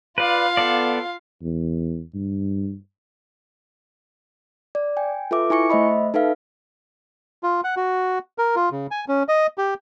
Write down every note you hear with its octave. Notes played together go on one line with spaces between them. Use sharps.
F4 B4 D5 F5
B3 A4 D5
E2
G2
D5
G5 G#5
F4 A4 B4 E5 D6
E4 G#5 C#6 C#7
A3 C5 D#5 E5 B5
D#4 A4 B4 E5 F5
F4
F#5
F#4
A#4
F4
C#3
G#5
C#4
D#5
G4